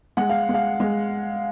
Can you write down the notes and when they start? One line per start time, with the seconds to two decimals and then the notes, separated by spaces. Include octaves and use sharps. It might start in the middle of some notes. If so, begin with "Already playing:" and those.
0.17 G#3 F#5
0.29 F5
0.49 G#3
0.54 F5
0.80 G#3